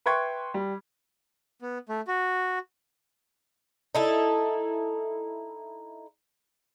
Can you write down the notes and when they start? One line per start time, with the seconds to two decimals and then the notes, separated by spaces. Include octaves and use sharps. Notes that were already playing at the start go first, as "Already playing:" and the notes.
0.06 B4 E5 G5 C6 C#6 G#6
0.54 G3
1.62 B3
1.89 A3
2.07 F#4
3.95 D#4 E4 A4